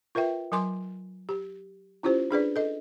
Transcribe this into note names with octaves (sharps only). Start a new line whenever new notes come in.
F4 A#4 B4 E5 G5
F#3 A#4 G#5 C6 D6
G4
C#4 E4 F4 G4 C5
D4 G#4 B4 D5
A4 D#5